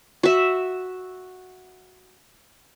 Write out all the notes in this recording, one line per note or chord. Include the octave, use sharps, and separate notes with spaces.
F#4 E5